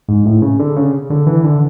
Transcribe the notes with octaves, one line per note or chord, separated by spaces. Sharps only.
G#2
A2
C#3
D3
C#3
D3
E3
D3